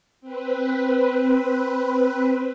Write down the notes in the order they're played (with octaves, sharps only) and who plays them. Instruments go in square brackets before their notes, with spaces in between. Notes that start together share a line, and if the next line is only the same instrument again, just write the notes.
[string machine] C4 B4